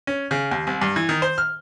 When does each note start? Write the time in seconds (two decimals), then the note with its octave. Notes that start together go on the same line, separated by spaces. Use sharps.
0.07 C#4
0.31 C#3
0.51 D#2
0.67 C2
0.82 G2
0.96 E3
1.09 D#3
1.22 C5
1.38 F6